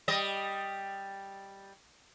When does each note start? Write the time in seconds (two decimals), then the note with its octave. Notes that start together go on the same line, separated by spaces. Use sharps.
0.08 G3 D#5